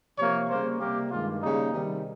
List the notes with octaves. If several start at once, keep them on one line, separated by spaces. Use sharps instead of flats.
C3 F3 A#3 C#5
C#3 G3 A#3 C5
C3 G3 A#3 G4
G2 D#3 G#3 F4
C#3 G3 A#3 D#4
C3 D#3 G3